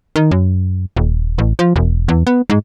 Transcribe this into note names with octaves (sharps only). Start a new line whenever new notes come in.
D#3
F#2
D#1
A1
F3
E1
E2
B3
G#2